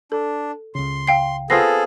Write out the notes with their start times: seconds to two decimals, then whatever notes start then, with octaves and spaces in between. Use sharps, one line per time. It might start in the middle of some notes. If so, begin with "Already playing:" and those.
0.12 D4 A4
0.75 C#2 C#3 C6
1.07 F5 G5 C7
1.50 B3 C4 F4 G#4 A4 A#6 C7